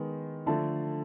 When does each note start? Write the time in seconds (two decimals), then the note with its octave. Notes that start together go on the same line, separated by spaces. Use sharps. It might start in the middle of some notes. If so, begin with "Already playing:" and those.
Already playing: D#3 G#3 B3
0.46 D3 F3 A3 A5